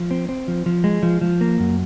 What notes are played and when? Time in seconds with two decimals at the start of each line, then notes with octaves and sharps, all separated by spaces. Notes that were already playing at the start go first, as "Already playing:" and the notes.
Already playing: F3
0.11 C4
0.29 C4
0.48 F3
0.66 F3
0.84 G#3
1.03 F3
1.21 F3
1.41 A#3
1.60 F#2